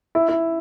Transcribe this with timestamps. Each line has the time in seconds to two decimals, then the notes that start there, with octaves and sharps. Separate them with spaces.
0.15 E4
0.29 E4